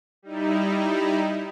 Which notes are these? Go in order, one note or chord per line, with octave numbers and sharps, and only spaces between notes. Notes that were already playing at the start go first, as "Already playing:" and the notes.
G3 D#4 E4